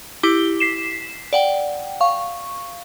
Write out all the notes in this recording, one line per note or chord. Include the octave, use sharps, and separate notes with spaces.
E4 G4 D6 G7
B6 C7 E7
D5 F#5 G5
F5 C#6